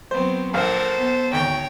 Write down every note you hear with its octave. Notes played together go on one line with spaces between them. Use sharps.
F#3 B3 C4 C5
A#1 A#2 A4 A#4 C5 F5 F#5
B3
G#1 D2 C#5 G5